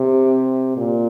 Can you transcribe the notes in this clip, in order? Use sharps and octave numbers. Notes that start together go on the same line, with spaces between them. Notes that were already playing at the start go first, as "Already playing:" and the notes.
Already playing: C3
A#2